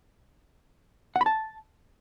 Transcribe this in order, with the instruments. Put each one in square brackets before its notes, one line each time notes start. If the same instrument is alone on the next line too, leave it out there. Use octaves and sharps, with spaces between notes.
[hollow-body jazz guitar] F#5
B5
A5